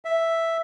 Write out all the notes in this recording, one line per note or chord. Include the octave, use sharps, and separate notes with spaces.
E5